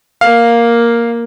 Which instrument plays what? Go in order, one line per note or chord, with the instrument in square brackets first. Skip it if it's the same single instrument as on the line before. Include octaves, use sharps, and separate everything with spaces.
[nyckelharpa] A#3 [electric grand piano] F5